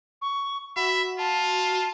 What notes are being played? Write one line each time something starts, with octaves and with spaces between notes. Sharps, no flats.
C#6
F#4 E5 B5
F4 A5